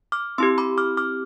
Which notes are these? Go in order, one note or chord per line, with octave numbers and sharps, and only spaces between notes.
D6 F6
C4 E4 G4 C6 E6
B5 D6
D6 F6
D6 F6